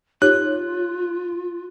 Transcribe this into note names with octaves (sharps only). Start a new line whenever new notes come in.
D#4 F4 G4 C#5 F#6